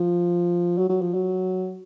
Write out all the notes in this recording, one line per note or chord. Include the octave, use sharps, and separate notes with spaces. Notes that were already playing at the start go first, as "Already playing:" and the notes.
Already playing: F3
F#3
F#3
F3
F#3